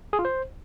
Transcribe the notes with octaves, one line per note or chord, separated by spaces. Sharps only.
G#4
F4
C5